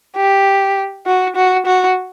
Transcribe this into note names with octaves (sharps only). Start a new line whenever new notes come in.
G4
F#4
F#4
F#4